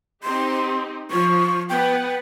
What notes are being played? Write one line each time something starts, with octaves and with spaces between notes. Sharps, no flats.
C4 D#4 G4 C6
F3 C#6
B3 B4 F#5 G5